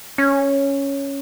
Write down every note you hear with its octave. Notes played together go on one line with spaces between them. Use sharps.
C#4